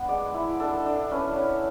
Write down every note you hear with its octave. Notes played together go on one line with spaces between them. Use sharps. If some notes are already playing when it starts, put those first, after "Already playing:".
Already playing: B3 D4 F#5
G#3 D5
E4
D4 A4
D4
C#4 B4
C#4